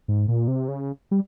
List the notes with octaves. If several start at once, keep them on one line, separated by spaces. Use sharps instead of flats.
G#2
A#2
C3
C#3
G3